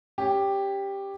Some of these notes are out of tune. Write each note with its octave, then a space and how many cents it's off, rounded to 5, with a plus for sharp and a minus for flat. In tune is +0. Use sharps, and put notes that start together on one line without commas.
C#4 +0 G4 +5